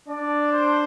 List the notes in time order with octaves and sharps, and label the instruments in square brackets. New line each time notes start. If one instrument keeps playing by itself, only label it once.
[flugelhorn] D4 [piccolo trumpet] D5
[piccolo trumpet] C5